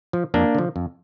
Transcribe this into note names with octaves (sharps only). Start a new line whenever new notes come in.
F3
F2 A#3 D4
D3 F3
F2